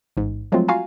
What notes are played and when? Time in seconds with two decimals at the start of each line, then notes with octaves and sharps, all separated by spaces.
0.17 A1 G#2
0.52 F3 F#3 G#3 A3 C4 F4
0.68 F4 F#4 F5 G#5 A#5